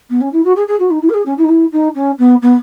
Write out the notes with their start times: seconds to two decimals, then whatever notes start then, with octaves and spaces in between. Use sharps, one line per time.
0.09 B3
0.20 C#4
0.32 E4
0.44 F#4
0.55 G#4
0.67 G#4
0.79 F#4
0.90 D#4
1.02 E4
1.09 A#4
1.13 G#4
1.25 C#4
1.37 E4
1.44 D#4
1.48 E4
1.72 D#4
1.95 C#4
2.18 B3
2.41 B3